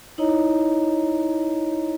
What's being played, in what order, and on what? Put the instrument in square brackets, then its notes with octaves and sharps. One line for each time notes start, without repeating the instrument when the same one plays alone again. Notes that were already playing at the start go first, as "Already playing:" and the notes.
[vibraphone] D#4 E4 C#5 D#5 A#5